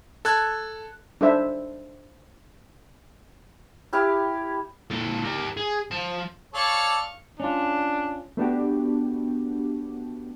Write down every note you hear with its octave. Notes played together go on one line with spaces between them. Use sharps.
A4 A5 F#6 G#6
D4 D#4 A4 C5 E5
E4 G4 F5
A#2 A4
G4 A#4
G#4
F3 A5
A4 C#5 D5 F5 C#6
C#4 D4 F4
A3 B3 D4 F#4 G4